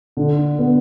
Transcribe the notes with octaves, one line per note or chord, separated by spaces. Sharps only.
D3
B3